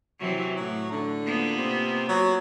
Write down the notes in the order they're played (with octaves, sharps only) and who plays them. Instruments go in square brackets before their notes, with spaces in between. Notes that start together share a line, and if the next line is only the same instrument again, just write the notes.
[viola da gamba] C3 E3 F#3
[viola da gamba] A2 [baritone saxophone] F#3
[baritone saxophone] D3
[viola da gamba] A#3 B3 F4
[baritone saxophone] C3
F#3